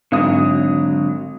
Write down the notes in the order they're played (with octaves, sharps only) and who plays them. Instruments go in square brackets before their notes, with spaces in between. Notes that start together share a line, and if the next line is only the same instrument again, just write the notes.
[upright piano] G#1 D#6 [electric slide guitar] D3 F#3